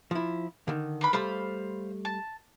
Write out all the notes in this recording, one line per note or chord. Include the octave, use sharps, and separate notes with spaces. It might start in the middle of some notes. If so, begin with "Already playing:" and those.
F3 E4
D3 D#3
A#3 B4 B5
G3 A3 C5 F5 B5
A5